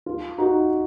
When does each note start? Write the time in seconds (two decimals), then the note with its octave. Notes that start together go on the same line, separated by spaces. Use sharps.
0.06 F4
0.38 D#4 F#4